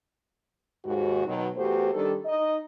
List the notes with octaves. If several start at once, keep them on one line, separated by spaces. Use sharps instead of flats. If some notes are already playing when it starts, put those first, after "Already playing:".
D#2 G#2 F#4
B2 D#3 F#3
E2 A3 F#4 G4 C5
D#3 G3 D4 A4
D#4 D#5